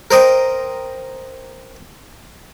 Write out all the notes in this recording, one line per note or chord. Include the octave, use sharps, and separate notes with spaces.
A#4 C5 D#5 G5